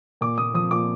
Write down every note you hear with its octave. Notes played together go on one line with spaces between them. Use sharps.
A#2 D6
A#2 D#6
F3 D#6
A#2 D6